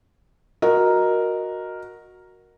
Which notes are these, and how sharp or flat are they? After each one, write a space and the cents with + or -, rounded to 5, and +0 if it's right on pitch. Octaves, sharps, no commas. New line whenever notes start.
F#4 -10 A#4 +0 D#5 -5